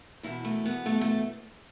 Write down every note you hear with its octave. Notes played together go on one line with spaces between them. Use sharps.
E2 B2 E4
A3
B3
A3
A3